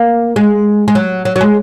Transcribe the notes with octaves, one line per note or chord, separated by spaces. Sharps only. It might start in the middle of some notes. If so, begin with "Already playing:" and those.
Already playing: A#3
G#3
G#3
F#3
F#3
F#3
G#3